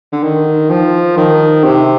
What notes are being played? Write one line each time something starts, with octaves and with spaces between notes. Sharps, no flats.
D3
D#3
F3
D#3
C3